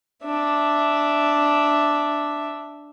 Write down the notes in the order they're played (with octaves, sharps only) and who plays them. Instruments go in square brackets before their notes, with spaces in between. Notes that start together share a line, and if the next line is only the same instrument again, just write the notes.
[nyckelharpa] D4 E5